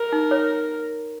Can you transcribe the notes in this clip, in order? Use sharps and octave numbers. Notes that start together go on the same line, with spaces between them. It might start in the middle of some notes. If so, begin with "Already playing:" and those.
Already playing: A#4
D#4
C#5